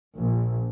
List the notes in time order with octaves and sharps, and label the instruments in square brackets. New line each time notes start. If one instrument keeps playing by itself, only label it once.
[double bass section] A#1